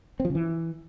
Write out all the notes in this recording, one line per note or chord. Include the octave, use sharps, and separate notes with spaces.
C4
F3
C#3
E3